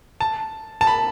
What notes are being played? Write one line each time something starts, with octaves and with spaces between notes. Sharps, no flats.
A5
A5
B5